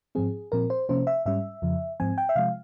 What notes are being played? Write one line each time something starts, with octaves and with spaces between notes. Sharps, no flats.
G#2 F3 C4 G#4
A#2 F3 C4 A#4
C5
C3 F3 A#3 C#4 C5
E5
G#2 G3 C#4 E5
F2 C#3 F3
G#2 F3 C4 G#5
G5
E5
C3 F3 G#3 F5